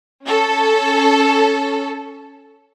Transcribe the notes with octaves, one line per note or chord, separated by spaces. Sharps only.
C#4 A4